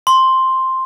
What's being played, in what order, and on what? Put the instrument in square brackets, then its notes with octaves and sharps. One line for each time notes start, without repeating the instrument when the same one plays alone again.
[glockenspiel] C6